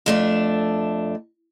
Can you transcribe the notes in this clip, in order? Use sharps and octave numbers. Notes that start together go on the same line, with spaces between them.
F2 A3 D4